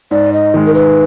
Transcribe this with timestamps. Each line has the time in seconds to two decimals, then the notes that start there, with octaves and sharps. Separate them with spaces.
0.11 G#2 D5
0.33 D#5
0.54 D#3 G#3
0.67 A#4
0.74 B4